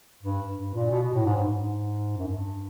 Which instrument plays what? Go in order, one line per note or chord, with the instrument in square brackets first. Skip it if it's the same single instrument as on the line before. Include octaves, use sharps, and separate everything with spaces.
[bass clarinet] G2
G2
A#2
B2
B2
A2
G#2
G2
G#2
F#2
G2